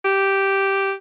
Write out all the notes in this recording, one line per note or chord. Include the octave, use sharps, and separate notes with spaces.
G4